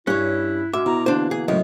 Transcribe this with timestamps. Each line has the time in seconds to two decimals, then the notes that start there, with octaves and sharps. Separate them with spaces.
0.07 G2 C#4 E4 C#5 F#6
0.73 G#2 G#3 C#4 F#4 E5 D6
0.86 B2 E4 A#5
1.06 D3 E3 A#3 D4 C5
1.31 G#4
1.48 C#2 F#2 A2 D#5